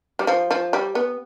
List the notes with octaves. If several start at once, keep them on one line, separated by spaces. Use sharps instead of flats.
G3
F3
F3
G3
B3